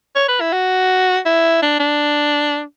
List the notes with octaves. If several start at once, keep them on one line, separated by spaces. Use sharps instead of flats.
C#5
B4
E4
F#4
E4
D4
D4